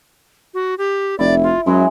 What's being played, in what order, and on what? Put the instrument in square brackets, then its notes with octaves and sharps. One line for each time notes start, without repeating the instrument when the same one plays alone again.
[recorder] F#4
G4
[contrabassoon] F1 [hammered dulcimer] E4 [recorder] D5
[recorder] F4
[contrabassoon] F#2 [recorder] F#3 [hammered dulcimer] G#3 C#4 E4